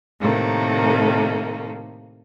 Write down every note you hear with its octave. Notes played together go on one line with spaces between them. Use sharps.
A2 C3 D#3 A3 A#3